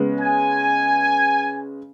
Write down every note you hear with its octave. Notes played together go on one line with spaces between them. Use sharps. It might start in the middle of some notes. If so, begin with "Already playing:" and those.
Already playing: C#3 G#3 B3
G#5